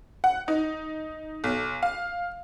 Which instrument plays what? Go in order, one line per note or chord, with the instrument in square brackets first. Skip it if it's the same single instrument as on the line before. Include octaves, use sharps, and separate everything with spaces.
[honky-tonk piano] F#5
D#4
B1
F5